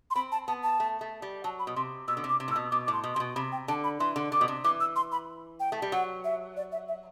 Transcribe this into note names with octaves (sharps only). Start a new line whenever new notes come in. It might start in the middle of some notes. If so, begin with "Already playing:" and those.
C6
C4 B5
A5
B3 A5
A5
A3
A3
G3
F#3 A5
B5
B2
C3 C6
B2 E6
D3
C3
D6
C3
A2
E6
B2
B2 D6
A2 D6
C6
B2
C3 C6
B2
C3 B5
G5
D3 A5
B5
E3 C6
D3
D3 D6
B2
C3
E3 D6
E6
C6
B5
G5
A3
G3
F#3 F#5
E5
D5
E5
E5